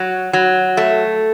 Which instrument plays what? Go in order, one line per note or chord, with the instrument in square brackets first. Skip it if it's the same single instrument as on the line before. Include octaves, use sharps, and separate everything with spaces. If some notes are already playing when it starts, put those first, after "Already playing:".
Already playing: [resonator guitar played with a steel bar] F#3
F#3
A3